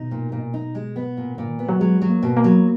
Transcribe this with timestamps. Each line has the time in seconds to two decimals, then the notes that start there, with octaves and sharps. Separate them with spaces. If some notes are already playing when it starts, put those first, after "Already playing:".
Already playing: B2 D#4
0.11 A#2
0.32 A#2
0.54 D#4
0.75 G#3
0.96 B3
1.17 A#2
1.35 A#2 D3
1.46 D#3
1.57 F3 B3
1.69 F#3
1.80 F#3 G#3
2.01 F#3
2.09 A#3
2.23 B2
2.37 A#3
2.44 F#3